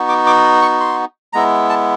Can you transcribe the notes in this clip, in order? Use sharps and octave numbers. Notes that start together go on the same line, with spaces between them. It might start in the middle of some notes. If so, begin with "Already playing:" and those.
Already playing: B3 D#4 F#4
D6
D6
C#6
C6
G#3 B3 E4 A#5
A5